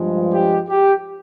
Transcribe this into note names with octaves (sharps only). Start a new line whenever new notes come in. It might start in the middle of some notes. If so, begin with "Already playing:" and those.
Already playing: G2 F3 G#3
G4
G4